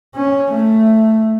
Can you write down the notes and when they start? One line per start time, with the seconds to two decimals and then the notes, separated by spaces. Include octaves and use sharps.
0.15 C#4
0.52 A3